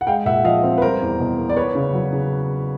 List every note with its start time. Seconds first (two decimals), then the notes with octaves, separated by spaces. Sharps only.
0.01 F#5
0.07 G#3 F5 G5
0.25 A#2 E5 F#5
0.44 F3 D#5 F5
0.63 C4
0.78 B4
0.82 G3 A#4 C5
1.01 E2
1.20 B2
1.37 A#3
1.49 D5
1.56 B3 B4 C#5
1.75 C#3
1.93 F#3
2.13 C#3